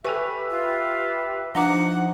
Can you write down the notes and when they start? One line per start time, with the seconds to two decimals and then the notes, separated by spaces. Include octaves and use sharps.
0.05 G4 A4 B4 E5 G#5 C#6
0.50 F4
1.55 F3 D4 D#4 F#5 A#5 D6